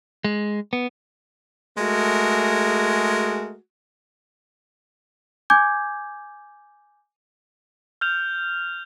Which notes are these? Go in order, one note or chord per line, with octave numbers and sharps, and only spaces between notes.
G#3
B3
G#3 A3 F#4 G#4 A#4
G#5 D6 G6 G#6
F6 G6 F7